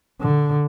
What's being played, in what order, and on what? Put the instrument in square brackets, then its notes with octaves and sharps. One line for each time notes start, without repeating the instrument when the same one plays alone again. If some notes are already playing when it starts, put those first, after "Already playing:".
[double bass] D3